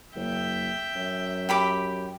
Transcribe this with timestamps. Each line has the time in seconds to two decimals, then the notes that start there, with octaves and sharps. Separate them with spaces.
0.15 F#1 E5 G5
0.96 F#2
1.49 G4 B5 D6